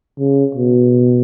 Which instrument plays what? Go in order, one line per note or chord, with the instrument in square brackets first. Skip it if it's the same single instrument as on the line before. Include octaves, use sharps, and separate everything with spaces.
[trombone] C#3
B2